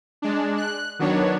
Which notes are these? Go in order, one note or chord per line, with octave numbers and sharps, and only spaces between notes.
G#3 D4
F#6
D#3 F#3 B3 D4 C#5